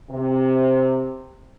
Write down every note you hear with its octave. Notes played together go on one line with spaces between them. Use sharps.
C3